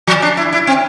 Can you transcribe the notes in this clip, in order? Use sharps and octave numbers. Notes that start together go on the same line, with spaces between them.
F3
D4
E4
E4
C4